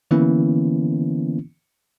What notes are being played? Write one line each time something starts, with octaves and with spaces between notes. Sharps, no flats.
D3 E3 A#3 B3 C#4 E4